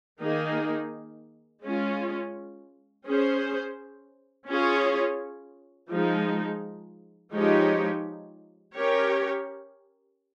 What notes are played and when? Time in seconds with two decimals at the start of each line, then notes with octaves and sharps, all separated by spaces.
0.20 D#3 A#3 D#4 G#4
1.63 G#3 C#4 F4
3.06 C#4 G#4 C5
4.48 C#4 F4 G#4 C#5
5.90 F3 G#3 D#4
7.33 F3 G#3 D#4 G4 C#5
8.75 C#4 G4 A#4 C#5